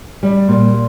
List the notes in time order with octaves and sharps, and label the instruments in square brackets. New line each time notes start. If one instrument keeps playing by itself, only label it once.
[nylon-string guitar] G3
A#2